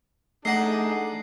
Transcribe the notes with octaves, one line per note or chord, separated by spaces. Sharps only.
A3 D4 D#4 G#4 D#5 F#5 C7